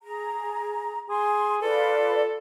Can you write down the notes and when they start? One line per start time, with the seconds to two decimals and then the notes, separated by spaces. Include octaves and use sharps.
0.03 G#4 A#5
1.09 G#4 C6
1.61 F4 A4 B4 D5